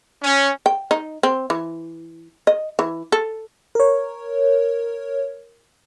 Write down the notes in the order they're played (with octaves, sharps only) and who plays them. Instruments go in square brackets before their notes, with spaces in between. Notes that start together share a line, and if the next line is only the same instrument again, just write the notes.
[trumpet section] C#4
[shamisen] G5
D#4
C4
E3
D#5
E3
A4
[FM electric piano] A#4 C#5